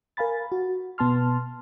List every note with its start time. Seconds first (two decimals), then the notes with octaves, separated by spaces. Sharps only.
0.17 A#4 F5 G#5 B5 A6
0.52 F#4
0.98 B2 B3 A5 C6 F6